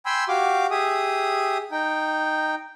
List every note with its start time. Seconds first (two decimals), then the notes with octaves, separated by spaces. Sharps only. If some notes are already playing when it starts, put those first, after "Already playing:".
0.06 G5 G#5 B5 C6 E6
0.28 F#4 G4 F5 D6
0.71 G4 G#4 E5 D#6
1.72 D#4 G5